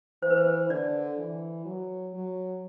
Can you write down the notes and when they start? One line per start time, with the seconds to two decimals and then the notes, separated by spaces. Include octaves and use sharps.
0.22 E3 C5
0.30 B4
0.37 C5
0.70 D3 D5
1.18 E3
1.65 F#3
2.13 F#3